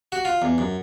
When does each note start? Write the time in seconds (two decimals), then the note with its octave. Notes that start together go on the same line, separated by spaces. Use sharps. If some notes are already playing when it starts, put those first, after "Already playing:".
0.12 F#4
0.25 F4
0.42 E2
0.58 F#2